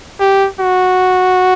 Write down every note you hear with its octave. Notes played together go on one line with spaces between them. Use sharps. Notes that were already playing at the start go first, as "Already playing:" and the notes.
G4
F#4